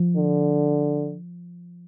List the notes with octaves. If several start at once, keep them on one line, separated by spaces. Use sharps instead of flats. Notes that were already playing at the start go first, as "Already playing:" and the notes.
Already playing: F3
D3